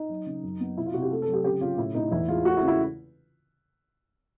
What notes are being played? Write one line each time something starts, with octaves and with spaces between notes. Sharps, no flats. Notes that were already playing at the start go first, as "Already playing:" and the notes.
Already playing: D#4
F#3
C#3
F#2
B3
C3 E4
F4
C3 F#4
G4
A3 A4
A4
F#3
G4
C#3 G4
C#3 F4
A2 E4
A2 D#4
E2 E4
G#3 F4
A3 F#4
E4
C#3
E4